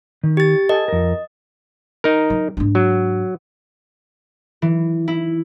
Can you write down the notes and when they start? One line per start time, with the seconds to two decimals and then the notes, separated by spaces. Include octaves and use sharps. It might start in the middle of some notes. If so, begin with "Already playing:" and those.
0.23 D#3
0.37 G4 A6
0.69 A4 D#5 G5 G#5
0.88 F2 A#4
2.04 D#4 A#4
2.30 F#3
2.57 G#2 D4
2.75 F#3
4.62 E3
5.08 E4